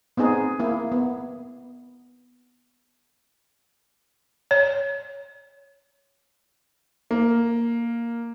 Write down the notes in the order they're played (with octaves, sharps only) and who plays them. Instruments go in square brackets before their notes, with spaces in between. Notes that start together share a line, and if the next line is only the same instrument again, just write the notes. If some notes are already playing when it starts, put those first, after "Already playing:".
[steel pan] B3 C4 D#4 G#4
A#3 E4
B3
[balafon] C#5
[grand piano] A#3